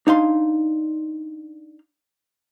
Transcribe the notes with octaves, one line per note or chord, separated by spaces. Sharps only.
D4 D#4 F5 C6